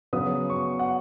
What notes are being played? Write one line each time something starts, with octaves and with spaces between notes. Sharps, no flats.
C#3 F#3 B3 D#6
C#6
F#5